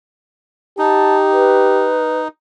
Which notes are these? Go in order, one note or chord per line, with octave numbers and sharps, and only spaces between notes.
D#4 G4 A5
B4